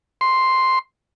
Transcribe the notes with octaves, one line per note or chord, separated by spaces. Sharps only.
C6